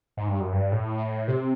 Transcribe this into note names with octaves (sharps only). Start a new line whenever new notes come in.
G#2
G2
F#2
G2
A2
C3